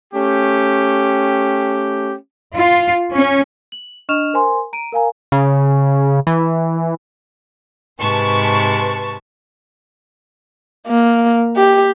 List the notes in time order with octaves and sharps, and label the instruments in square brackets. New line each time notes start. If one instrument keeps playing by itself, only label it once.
[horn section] A3 C#4 G4
[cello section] F4
C#4
[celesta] F#7
D4 D#5 C#6 F6 E7 F7
A#4 C5 G#5 C6
A#5 D7 D#7
A#4 F5 G#5 A#5
[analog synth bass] C#3
E3
[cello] G#2 C3 [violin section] B4 A5 C#6
[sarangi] A#3
G4